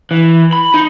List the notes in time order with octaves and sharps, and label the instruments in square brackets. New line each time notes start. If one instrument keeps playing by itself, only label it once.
[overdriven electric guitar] E3
B5
D#4